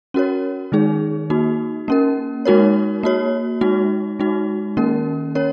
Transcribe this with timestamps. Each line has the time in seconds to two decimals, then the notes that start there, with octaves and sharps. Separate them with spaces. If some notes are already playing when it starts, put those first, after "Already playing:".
0.14 C#4 F#4 A#4 C#5
0.72 D#3 G#3 D#4 G#4
1.30 A#3 D#4 F#4
1.88 A#3 C#4 A#4
2.45 G#3 D#4 F#4 A#4 C#5
3.03 A#3 F#4 C#5
3.61 G#3 D#4 F#4
4.20 G#3 D#4 F#4
4.77 D#3 A#3 C#4 A#4
5.35 C#4 A#4 C#5